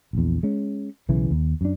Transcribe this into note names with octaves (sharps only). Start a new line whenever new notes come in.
A#1 E2
G#3 C#4
B1 C#3 E3
D#2
F#2 D4